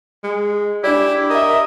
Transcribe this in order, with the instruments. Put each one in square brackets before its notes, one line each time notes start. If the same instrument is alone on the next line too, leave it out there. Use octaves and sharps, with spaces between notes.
[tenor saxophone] G#3
[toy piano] D4 D5 [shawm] E4 [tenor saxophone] G4
[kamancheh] A#4 E5 [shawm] D#5